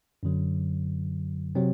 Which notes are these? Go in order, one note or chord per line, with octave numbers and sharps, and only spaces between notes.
F#2 D3 F#3
C3 F#3 C4